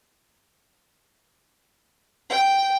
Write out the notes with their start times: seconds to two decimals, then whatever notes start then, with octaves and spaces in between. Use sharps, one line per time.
2.30 G5